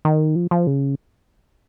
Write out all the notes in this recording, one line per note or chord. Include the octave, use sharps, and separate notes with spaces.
D#3
F3
F3
C#3